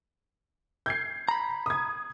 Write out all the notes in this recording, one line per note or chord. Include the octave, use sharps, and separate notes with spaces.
G6 G#6 C7
A#5 B5
D#6 G#6